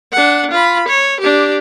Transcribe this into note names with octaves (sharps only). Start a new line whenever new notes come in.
D4 F#5
F4 B5
C#5
D4 G4